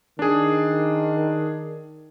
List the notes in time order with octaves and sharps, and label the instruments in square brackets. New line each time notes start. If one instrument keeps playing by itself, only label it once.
[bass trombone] D#3 [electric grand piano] D4 G#4